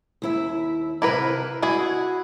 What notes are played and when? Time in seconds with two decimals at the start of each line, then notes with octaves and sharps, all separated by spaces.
0.22 D#2 E4 E5
1.02 C3 E4 A#4 B4 F5
1.62 E4 F#4 G#4